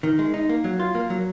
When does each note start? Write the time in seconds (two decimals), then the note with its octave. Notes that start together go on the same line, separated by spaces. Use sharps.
0.03 D#3
0.19 G#3
0.34 D#4
0.49 A#3
0.64 F#3
0.80 F4
0.95 A#3
1.10 F#3